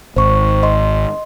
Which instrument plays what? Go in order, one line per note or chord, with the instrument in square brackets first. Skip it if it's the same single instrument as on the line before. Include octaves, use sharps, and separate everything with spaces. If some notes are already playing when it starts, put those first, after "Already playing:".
[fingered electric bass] G#1 [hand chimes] C5 C#6
[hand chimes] D#5 C6